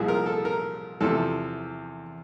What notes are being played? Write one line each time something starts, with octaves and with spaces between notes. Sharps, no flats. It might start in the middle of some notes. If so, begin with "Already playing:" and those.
Already playing: C2 A#2 F3 G#4
A#4
A4
A#4
E2 C3 F3 A4